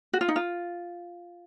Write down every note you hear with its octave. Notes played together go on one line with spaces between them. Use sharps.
F#4
F4
D#4
F4